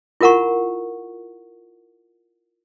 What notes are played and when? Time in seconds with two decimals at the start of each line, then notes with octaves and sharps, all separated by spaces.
0.21 E4 F4 A#4 F#5 A#5 C#6